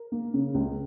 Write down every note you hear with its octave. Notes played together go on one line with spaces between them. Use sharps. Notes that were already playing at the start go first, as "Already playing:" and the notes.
Already playing: A#4
A#3
C#3
C#2